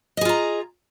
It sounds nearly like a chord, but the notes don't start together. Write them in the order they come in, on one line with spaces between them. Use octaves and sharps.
D#5 G#4 F4 A#5